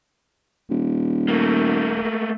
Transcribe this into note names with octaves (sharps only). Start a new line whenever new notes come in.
D#1
A3 A#3